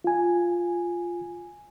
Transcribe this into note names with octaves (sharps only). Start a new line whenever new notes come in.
F4 G#5